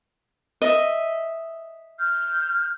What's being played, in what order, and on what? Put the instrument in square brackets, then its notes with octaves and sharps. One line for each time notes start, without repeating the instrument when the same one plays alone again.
[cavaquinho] D#5 E5
[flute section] F6 G6